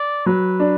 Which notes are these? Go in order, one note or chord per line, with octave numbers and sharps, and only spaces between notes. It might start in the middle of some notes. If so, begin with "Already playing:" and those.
Already playing: D5
F#3 B4
D4